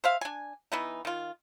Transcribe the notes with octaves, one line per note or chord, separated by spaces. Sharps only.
C5 E5 F5
D4 G#5
E3 B3 D#4
D#3 F4